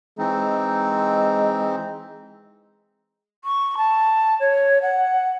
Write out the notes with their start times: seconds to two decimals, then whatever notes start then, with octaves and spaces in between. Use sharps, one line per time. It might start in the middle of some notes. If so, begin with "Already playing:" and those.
0.18 E3 G#3 C4 D#4
3.44 C#6
3.77 A5
4.40 C#5
4.82 F#5